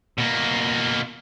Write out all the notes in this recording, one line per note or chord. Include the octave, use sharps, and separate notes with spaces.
B2 A#3